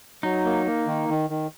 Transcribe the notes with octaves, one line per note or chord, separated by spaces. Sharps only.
F#3 D#4
A#3
A#3
D#3
D#3
D#3